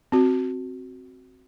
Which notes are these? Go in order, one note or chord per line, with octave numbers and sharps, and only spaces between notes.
C4 F#4